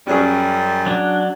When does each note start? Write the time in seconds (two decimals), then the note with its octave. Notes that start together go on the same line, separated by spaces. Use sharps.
0.07 F#2 G3 C#4 G#4
0.86 F#3 D4